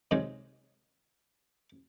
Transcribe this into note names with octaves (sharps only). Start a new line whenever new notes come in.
C3 D#3 F#3 G#3